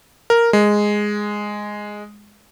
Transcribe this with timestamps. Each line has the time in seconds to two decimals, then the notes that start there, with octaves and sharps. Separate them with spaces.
0.30 A#4
0.53 G#3